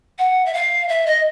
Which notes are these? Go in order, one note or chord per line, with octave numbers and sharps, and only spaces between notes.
F#5
E5
F5
E5
D#5